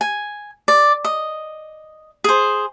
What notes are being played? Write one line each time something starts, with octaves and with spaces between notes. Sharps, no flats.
G#5
D5
D#5
G#4 C5